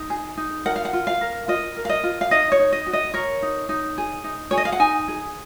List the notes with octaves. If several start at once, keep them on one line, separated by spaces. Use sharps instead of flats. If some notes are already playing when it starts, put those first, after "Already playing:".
Already playing: D#4
G#4
D#4
A#4 F#5
F5
F#5
F4
F5
A#4
F4 D#5
A#4
F5
D#5
F4
F5
D#4 D#5
C#5
D#4
D#5
F#4
D#5
A#4 C#5
D#4
D#4
G#4
D#4
G#4 C#5
D#5
F5
F#5
D#4 G#5
G#4